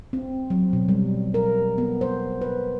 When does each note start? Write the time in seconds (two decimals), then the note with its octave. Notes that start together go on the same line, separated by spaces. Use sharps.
0.13 C4
0.50 F#3
0.73 B2
0.89 G3
1.34 A#4
1.78 B3
2.01 C5
2.41 B4